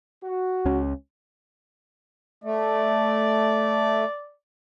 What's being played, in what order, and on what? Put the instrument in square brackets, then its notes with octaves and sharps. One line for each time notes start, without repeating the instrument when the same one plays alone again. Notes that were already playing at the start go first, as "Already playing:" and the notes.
[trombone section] F#4
[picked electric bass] C#2 C#4
[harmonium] A3 [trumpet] D5